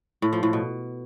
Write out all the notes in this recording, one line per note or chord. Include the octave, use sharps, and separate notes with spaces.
A2
F3
A2
B2